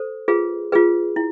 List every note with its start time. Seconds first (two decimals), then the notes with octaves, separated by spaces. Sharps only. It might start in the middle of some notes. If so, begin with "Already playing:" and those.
Already playing: A4 C5
0.28 F4 G#4 B4
0.72 F4 G#4 B4
1.16 E4